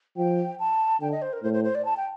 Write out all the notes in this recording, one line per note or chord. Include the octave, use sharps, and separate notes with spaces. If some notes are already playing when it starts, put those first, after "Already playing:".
F3 G5
A5
D3 G5
D#5
C5
A#4
A2 C5
C5
C5
D5
A5
G5